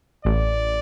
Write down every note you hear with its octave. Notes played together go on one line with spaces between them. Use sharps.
A1 D5